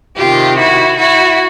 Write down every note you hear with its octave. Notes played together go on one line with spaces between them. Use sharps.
C3 D#3 F4 G4
E4 F#4
E4 F#4